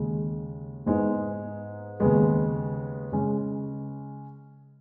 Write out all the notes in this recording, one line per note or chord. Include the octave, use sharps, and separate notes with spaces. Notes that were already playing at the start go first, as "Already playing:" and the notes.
Already playing: D#2 C#3 G#3
G#2 G#3 B3 D#4
D#2 C#3 G#3 B3
C#3 G#3 C#4